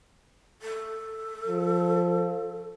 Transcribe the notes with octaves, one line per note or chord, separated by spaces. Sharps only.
A4
F3